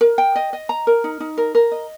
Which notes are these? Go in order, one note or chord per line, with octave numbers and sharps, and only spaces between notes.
A#4
G5
D#5
D#5
A#5
A#4
D#4
D#4
A#4
A#4
D#5